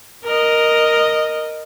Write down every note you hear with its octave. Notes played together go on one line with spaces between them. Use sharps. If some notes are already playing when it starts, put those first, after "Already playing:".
A#4 D#5